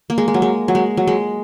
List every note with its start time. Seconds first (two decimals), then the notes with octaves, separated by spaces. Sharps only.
0.10 A#3
0.18 G#3
0.28 G#3
0.34 F#3
0.42 G#3
0.68 F#3
0.75 G#3
0.97 F#3
1.07 G#3